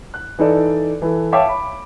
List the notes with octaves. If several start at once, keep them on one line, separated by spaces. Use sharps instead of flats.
F#6
E3 D#4 A4 D5
E3 A4
C#5 E5 F5 G5 A5 D6
B5